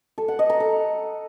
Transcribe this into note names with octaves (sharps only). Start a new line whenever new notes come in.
A4
F#5
D#5
A#5
A4